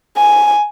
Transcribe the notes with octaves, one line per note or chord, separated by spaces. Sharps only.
G#5